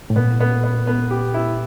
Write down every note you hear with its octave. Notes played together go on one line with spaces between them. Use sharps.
A2
A#2 B3
B3
B3
B3
G4
E4